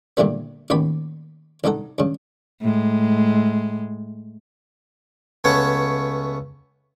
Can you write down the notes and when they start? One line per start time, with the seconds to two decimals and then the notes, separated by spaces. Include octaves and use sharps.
0.17 G2 A#2 D3 E3 G3 B3
0.70 A1 D#2 B3 G4 B5
1.64 C2 G2 D#4 A4 F#5
1.98 G2 C#3
2.61 A2 G#3
5.44 C#2 A3 B3 C#4 C#5 F#5